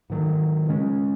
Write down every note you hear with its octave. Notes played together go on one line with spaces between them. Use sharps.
G#2 D#3 F#3
C#3 G#3 C#4